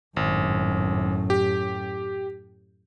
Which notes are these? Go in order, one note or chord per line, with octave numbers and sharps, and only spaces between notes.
G#1 F#2 A2
G4